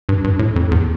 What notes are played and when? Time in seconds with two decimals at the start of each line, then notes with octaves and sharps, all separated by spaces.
0.09 G2
0.24 G2
0.39 A2
0.56 F2
0.71 E2